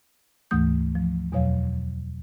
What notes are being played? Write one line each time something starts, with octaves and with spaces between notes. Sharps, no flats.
D2 G#2 E3 A3 D#6 G6
F3
E2 B2 F#3 C#5 F5